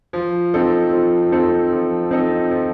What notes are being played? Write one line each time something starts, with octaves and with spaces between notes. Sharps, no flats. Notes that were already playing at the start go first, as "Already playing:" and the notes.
F3
C4 D#4 A4
F3
C4 D#4 A4
F3
C4 D#4 A4
F3